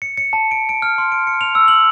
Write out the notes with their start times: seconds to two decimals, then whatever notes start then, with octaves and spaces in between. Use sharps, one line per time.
0.02 C#7
0.17 C#7
0.33 A5
0.51 D7
0.69 D7
0.82 F6
0.98 C6
1.12 D7
1.27 C#7
1.41 F7
1.55 E6
1.68 F#7